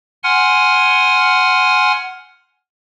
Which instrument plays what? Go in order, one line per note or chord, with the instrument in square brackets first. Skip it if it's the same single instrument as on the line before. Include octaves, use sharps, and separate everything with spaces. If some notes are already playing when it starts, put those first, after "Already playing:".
[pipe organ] F#5 G#5 C6 F6